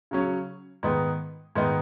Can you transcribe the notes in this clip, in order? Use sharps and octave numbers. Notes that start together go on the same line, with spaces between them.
C#3 F#3 C#4
G#2 D#3 B3 D#4
G#2 D#3 B3 D#4